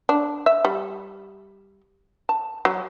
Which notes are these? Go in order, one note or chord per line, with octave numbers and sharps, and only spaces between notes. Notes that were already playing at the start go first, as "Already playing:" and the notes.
D4
E5
G3
A5
F#3